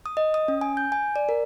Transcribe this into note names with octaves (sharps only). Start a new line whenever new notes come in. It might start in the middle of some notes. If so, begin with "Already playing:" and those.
D#6
D#5
D#6
C#4
G#5
G6
G#5
D5
A#4